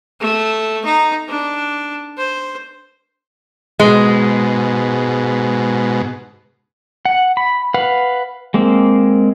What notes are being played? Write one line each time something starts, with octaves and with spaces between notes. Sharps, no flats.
A3
D#4
D4
C5
G#2 B2 G#3
F#5
B5
B4 F5 F#5
G#3 A#3 C4